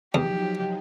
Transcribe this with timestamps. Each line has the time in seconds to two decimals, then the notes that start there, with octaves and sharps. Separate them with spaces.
0.14 E2 F3 F#3 D#4 G4